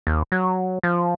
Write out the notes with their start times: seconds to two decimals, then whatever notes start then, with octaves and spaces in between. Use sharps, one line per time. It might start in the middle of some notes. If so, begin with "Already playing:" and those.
0.07 D#2
0.32 F#3
0.83 F3